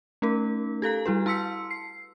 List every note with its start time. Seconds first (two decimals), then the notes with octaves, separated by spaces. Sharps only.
0.22 A3 C#4 D#4 A#4
0.82 G4 A4 F5 A#5
1.06 G3 E4 F#4 B4
1.26 E4 A5 C6 E6 B6 C#7
1.71 C7